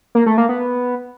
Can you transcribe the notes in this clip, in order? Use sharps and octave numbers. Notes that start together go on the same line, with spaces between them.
A#3
A3
A#3
B3